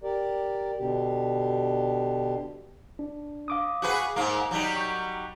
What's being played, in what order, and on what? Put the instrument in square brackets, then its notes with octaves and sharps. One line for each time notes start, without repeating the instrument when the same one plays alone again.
[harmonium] G4 A#4 D5
B2 D3 G4
[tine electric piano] D4
F5 D6 D#6
[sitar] F#4 G#4 B4
G#2 A#3
F#3 G3 D#4
[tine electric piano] C#6 G6